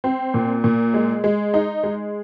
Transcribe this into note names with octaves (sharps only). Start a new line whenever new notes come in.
C4
A#2
A#2
G#3
G#3
D#4
G#3